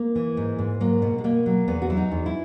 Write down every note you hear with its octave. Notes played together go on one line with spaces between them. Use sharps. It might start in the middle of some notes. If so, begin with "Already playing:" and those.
Already playing: A#3
E3
G#2
G#2
F#3 A#3
B2
G#3
B2 A#3
F#3
E2 B3
F#4
F#3 E4
D#4
E2
E4